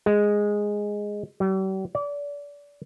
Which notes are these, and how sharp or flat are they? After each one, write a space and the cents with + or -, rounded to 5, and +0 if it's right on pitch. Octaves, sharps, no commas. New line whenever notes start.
G#3 -5
G3 -45
D5 -30